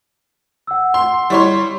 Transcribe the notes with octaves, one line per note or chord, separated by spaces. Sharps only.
F#5 E6
C6
G3 E4 C#5 C6